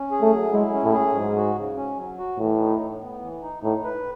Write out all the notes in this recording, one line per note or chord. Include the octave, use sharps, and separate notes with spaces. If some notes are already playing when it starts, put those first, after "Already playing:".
Already playing: C#4
G#4
A3
F#3
G#3 E4
C#4
A2
G#4
G#2 F#3
F#4
C#3
C#4
F#3
F#4
A2 E3
D#4
A2
B3
E3
D#4
A2 D#4
B4